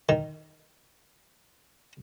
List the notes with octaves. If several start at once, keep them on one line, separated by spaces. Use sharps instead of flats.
D#3